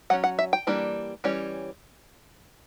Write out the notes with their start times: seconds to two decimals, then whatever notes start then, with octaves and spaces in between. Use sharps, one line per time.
0.10 F#3 C#4 F#5
0.24 F#5
0.39 E5
0.53 G5
0.67 E3 G3 A#3 D4
1.24 E3 G3 C#4